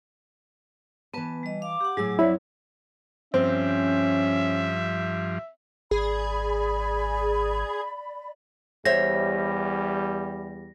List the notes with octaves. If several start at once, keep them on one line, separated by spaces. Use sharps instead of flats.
E3 B3 B4 A5
G3 D#5
F5 D6
G4 F#5
A2 F#3 G#4 E6
F2 C4 E4 C#5 D5 E5
G2 F3 C4 C#4 E5
G#1 G#4 D5 B5
E2 G3 C5 C#5 E5 A#6